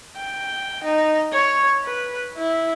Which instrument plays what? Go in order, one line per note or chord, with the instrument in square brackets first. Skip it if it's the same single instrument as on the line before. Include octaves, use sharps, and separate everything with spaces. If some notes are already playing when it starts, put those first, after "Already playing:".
[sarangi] G5
D#4
C#5
B4
E4